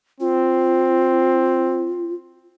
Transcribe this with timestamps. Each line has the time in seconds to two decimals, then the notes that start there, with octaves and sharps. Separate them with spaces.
0.20 C4 F4